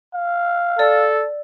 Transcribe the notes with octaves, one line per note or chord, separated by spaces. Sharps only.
F5
A4 D5 E6